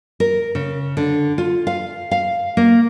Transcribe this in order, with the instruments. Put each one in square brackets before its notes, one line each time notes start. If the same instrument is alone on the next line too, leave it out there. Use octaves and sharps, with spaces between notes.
[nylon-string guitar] A#4
C#3
D3
F4
F5
F5
A#3